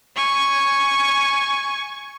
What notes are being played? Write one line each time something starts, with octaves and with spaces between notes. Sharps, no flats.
G#5 C#6